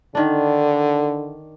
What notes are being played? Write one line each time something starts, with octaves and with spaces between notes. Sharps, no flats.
D3 D#3 D4